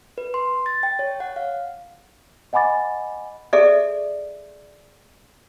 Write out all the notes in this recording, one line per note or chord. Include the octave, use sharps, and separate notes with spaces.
B4
C6
A6
G5
C#5
F#5
F5
D#5 F#5 G#5 B5 D6 A6
G#4 A4 D5 E5